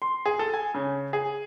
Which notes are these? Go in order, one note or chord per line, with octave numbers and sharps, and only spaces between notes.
C6
G#4
A4
G#5
C#3
G#4